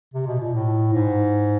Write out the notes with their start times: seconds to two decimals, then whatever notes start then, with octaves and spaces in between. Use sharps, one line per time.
0.14 C3
0.26 B2
0.40 A#2
0.53 A2
0.93 G#2